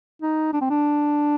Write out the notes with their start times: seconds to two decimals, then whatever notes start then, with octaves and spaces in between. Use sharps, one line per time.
0.22 D#4
0.53 D4
0.61 C4
0.70 D4